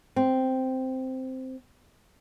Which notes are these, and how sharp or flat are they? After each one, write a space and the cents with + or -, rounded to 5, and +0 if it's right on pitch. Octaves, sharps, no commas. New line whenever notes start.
C4 -5